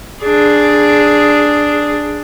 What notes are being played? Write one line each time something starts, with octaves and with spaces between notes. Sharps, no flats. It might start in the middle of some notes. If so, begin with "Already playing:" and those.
D4 G#4